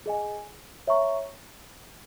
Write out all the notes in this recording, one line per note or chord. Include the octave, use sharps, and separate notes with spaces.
G#4 D#5 G#5
C#5 E5 A#5 C#6